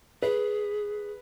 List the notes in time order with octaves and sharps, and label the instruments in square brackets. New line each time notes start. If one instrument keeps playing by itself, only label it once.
[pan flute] G#4 [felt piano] B4